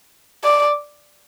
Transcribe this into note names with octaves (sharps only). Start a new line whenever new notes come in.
D5